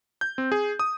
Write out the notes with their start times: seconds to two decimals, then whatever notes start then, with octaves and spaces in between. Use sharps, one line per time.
0.21 G6
0.38 C4
0.52 G#4
0.79 D#6